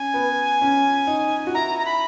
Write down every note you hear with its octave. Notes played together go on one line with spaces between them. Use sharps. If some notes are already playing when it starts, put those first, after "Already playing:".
Already playing: C#4 G#5
B3
C#4
D#4
F#4
E4 A#5
A#5
B5